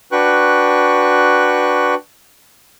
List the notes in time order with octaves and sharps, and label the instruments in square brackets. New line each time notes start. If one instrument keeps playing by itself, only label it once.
[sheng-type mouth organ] D4 F#4 B4 G5 C#6 F#6